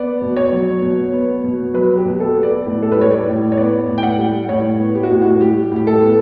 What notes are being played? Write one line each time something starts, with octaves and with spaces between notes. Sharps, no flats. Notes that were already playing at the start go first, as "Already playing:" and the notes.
Already playing: B3 D5
B2
C#5
F#3
B2
B3
B2
F#3 B4
G4
B2
A4
B3
D5
A2
A4
B4
G3 C#5
D5
A2
C#5
B3 D5
A2
G5
F#5
G3
A2 C#5
B3
G4
F#4
A2
F#4
G3 G4
A2 G4
A4
B3